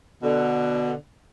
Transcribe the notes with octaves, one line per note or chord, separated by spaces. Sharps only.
B2 D3